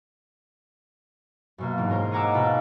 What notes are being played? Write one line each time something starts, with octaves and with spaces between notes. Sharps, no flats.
F#2 B2 A#3
G#2 E3
C#4 A#4 C5
D#5 F#5 G#5 A#5 D6 E6
B2 F4 A5 B5